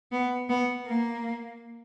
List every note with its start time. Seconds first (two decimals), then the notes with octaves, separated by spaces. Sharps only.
0.12 B3
0.49 B3
0.86 A#3